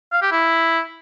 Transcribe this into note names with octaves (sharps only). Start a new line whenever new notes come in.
F5
G4
E4